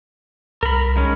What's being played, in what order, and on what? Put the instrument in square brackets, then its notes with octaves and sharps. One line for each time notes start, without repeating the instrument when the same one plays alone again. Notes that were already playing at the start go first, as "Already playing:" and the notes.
[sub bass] C2 [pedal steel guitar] A#4 B5
[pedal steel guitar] D#3 G#3 C#4